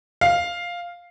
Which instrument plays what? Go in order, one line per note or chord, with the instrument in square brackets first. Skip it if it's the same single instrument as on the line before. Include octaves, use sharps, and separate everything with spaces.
[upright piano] F5